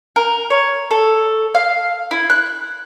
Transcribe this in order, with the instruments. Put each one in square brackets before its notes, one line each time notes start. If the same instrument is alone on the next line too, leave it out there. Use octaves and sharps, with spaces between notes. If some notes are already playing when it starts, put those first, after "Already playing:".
[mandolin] A#4
C#5
A4
F5
E4
F#6